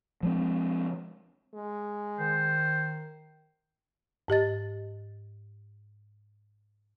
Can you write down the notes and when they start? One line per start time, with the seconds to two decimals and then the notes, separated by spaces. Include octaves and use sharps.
0.23 F3 G#3 C4
1.54 G#3
2.19 D#3 C5
4.28 G#2 G4 D#5 A6